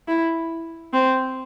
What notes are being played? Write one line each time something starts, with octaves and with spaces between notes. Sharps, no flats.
E4
C4